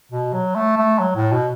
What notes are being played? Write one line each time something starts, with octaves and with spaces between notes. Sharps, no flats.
B2
F#3
A3
A3
F#3
A2
B2